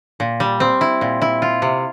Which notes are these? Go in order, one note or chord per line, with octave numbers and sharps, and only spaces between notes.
A#2
G3
C4
E4
A#2
E4
F4
C3